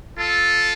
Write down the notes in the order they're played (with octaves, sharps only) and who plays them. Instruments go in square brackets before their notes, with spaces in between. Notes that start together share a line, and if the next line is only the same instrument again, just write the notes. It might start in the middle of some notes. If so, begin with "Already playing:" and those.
[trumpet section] F4 A4